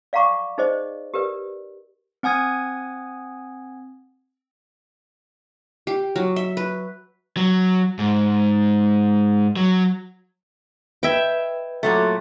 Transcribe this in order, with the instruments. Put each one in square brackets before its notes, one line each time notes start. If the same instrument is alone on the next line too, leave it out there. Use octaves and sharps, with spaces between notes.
[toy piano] D5 F5 F#5 A#5 C#6 D6
D#4 G#4 C5 D5 D#5
G4 A#4 B4 D5
[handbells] C4 F#5 G#5 D#6 G#6
[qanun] G4
F#3
E5
B4
[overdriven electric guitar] F#3
G#2
F#3
[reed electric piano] B4 D#5 G#6 [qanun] E5 G5
[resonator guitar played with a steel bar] A#2 F#3 A3